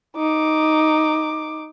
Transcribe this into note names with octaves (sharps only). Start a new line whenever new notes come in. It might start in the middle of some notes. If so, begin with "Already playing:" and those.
D#4 D6